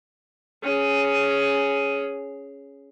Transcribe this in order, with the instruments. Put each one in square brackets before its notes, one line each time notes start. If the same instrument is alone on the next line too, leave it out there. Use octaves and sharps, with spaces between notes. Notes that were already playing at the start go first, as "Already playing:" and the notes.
[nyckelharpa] C#4 G#4